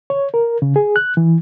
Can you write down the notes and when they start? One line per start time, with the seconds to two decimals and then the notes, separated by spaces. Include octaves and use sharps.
0.10 C#5
0.34 A#4
0.62 C#3
0.76 G#4
0.96 F#6
1.17 E3